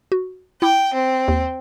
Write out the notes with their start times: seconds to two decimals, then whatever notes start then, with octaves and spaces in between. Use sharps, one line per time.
0.12 F#4
0.62 E4 G5 B5 D6
0.94 C4
1.28 D#2